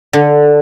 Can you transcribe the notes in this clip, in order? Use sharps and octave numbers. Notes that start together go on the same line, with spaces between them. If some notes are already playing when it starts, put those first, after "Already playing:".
D3